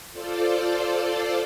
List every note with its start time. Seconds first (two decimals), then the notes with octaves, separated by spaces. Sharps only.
0.10 F4 A4 C5 D5